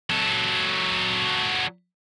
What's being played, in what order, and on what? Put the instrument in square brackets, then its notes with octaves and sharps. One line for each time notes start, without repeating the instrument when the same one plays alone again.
[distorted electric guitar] F#3 A4